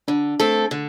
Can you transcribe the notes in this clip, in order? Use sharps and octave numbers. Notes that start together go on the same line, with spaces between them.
D3 D4
A3 C4 A4
D3